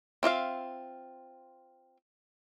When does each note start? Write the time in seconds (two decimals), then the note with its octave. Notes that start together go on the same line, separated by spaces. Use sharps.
0.23 C4 F4 E5 F5